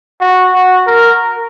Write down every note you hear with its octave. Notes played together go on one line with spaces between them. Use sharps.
F#4
F#4
A#4